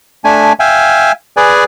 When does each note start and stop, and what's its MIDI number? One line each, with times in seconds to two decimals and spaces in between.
0.24 0.53 57
0.24 0.53 62
0.24 0.53 80
0.60 1.12 76
0.60 1.12 77
0.60 1.12 79
0.60 1.12 80
1.37 1.64 68
1.37 1.64 71
1.37 1.64 74
1.37 1.64 80